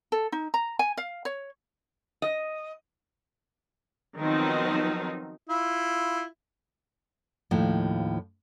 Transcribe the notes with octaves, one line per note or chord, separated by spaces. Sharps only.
A4
D#4
A#5
G#5
F5
C#5
D#5
D#3 F3 F#3 B3 C4 D#4
E4 F4
D#2 A2 F3